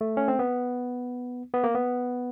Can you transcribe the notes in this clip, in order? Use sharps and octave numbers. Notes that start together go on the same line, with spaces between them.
A3
C#4
C4
B3
B3
A#3
B3